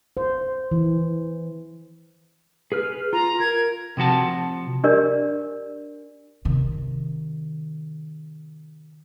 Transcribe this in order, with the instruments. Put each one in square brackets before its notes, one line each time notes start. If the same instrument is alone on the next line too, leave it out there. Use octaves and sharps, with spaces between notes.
[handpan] C5
E3
[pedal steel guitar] G#4 B4 F6
[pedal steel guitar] F4 [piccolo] A#5
[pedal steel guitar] A#4 [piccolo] G#6
[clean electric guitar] C3 F3 F#4 A5
[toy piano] D4 G4 A#4 D5
[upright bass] C3 D#3